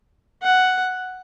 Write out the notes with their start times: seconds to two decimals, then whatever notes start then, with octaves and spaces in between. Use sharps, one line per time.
0.43 F#5